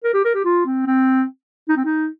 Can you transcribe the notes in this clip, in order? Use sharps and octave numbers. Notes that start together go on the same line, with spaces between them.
A#4
G4
A#4
G4
F4
C4
C4
D#4
C4
D#4